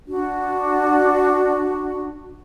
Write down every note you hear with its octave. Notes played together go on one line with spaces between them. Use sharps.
D4 F#4